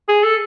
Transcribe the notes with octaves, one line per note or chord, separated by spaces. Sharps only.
G#4
A4